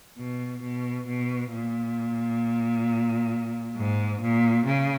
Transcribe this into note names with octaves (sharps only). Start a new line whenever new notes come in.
B2
B2
B2
A#2
G#2
A#2
C#3